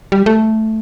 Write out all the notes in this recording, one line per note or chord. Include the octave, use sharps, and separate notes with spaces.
G3
A3